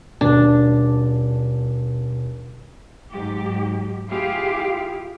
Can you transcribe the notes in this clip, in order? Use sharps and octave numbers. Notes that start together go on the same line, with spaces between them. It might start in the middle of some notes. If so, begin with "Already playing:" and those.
D#1 B2 D4
G#2 F#3 G4
E4 F4 G4 G#4 F5